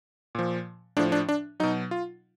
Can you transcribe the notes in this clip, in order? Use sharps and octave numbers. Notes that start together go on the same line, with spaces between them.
A#2 F3
A2 F3 D4
D4
D4
B2 F#3 D#4
F4